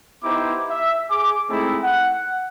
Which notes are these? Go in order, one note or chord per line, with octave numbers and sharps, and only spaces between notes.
B3 D#4 E4 G4 C5 D6
E5
G#4 D6
G#3 A3 C4 D#4 E4 G#4
F#5